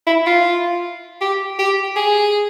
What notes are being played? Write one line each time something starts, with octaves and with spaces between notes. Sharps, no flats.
E4
F4
G4
G4
G#4